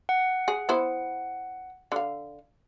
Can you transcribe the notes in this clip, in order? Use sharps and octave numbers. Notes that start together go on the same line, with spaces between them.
F#5
G#4
B3 E4 C5
D3 F5